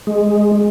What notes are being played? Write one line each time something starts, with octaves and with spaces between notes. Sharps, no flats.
G#3